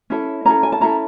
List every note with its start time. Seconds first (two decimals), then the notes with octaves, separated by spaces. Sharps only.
0.10 C#4 E4 A4
0.45 C#4 E4 A4 A#5
0.63 G#5
0.72 A5
0.80 C#4 E4 A4 A#5